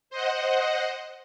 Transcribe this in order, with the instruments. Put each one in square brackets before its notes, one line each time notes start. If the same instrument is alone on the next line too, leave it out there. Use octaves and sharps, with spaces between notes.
[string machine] C5 D#5 F#5